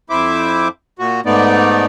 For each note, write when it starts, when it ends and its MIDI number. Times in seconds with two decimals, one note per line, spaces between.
0.10 0.68 41
0.10 0.68 64
0.10 0.68 72
0.10 0.68 76
0.10 0.68 86
0.99 1.20 46
0.99 1.20 66
1.26 1.86 44
1.26 1.86 57
1.26 1.86 59
1.26 1.86 63
1.26 1.86 74